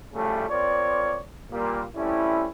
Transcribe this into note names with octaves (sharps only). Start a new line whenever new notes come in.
A2 C#3 F3 G3 A3
C4 F4 A#4 C#5 D5
A#2 G3 A#3
G3 A3 C4 C#4 E4